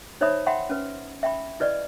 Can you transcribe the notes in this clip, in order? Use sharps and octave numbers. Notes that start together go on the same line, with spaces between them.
D#4 C5 C#5 E5 B5 D#6
E5 F#5 G5 B5 C6
C#4 B4
E5 G5 B5
E4 B4 D5 D#5